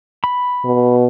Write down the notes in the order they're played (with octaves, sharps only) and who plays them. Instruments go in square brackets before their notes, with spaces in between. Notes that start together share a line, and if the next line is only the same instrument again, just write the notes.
[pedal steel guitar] B5
[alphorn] B2